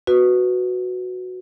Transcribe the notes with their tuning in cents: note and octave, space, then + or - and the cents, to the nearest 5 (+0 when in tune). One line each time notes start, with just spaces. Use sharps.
F#4 -5 B4 +0